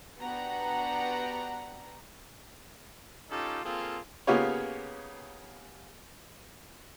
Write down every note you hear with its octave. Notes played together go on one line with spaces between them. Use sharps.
B3 D4 F#4 G4 F#5 A#5
C#4 D#4 F4 G4 A4
A#3 C4 F4 G#4 A4
C#3 A#3 B3 F4 G4 C#5